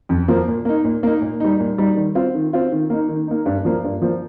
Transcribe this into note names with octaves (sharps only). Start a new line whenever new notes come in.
F2
F3 A#3
A#2
A#3 D#4
A#2
A#3 D#4
A#2
G3 D#4
A#2
G3 D#4
D#3
C4 F4
D#3
C4 F4
D#3
A#3 D#4
D#3
A#3 D#4
G2
F3 A#3
G2
F3 A#3